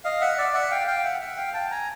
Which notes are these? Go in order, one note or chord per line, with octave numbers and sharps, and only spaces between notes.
D#5 F5
E5 F#5
D5 E5
E5 F#5
F5 G5
F5 G5
E5 F#5
E5 F#5
F5 G5
G5 A5
G#5 A#5